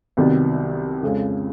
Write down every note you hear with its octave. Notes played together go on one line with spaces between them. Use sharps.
C2 C3 D#3 F#3 B3
F2 C#3 F3 G#3